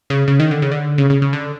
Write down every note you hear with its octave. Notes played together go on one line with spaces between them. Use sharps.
C#3
C#3
D#3
D3
C#3
D3
C#3
C#3
C#3
D3